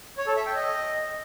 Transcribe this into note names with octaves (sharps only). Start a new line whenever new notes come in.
C#5
A4
E5
G5
D#5